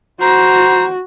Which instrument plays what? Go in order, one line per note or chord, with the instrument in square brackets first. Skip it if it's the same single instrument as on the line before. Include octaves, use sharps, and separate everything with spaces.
[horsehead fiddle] F#4 [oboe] C5 [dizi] A#5